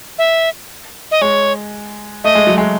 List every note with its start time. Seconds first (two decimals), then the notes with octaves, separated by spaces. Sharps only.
0.18 E5
1.11 D#5
1.21 G#3 C#5
2.24 A3 D#5
2.35 G#3
2.47 F#3
2.58 G#3